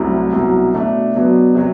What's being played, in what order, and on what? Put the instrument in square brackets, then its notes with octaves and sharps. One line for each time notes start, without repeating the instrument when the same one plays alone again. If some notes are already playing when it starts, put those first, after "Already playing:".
Already playing: [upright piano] C2 C3 F#3 A3 E4
C2 B2 F#3
B2 A3 D4
B2 F#3 B3 D4
C3 F#3